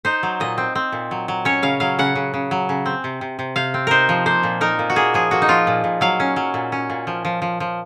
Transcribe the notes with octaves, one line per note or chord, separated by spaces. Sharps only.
D#4 C5
F#3
A#2 D#5
C4
C4
A#2
F#3
F#3
C#4 C#5
C#3 F5
F#3 F5
C#3 F#5
C#3
C#3
F#3
C#3
C4
C3
C3
C3
C3 F5
C4
D#4 A#4 C5
F3
A#3 C5
A#2
D#4 A#4
A#2
F#4
A#3 G#4
F3 G#4
A#3 F#4
D#4
F3 F4
A#2
A#2
F#3 F5
C#4
F#3
A#2
C#4
A#2
F3
F3
F3
F3